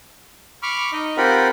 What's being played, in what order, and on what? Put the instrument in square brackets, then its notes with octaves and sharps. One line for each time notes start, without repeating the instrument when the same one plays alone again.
[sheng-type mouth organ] B5 C#6 D6 F6
D#4 D#5
C4 F4 G4 A#4 F#5 B5